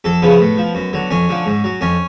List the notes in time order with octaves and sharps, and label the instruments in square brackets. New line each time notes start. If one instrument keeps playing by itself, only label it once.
[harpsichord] F2 A4
C#3 F3 B3
A2
F3
F#2
D3 F#3
F2 C#4
D3 F3
G#2
F#3
F2 C#4